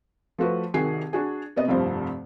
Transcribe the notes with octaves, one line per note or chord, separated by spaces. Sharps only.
F3 A3 F#4 B4
C2 D#3 F#4 G#4 C7
D4 F#4 G#4
C3 B3 D#5
F1 C2 G2 F3 C5